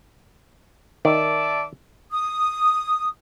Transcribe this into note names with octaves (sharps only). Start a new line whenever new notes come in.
D#3 D5 E5 A5
D#6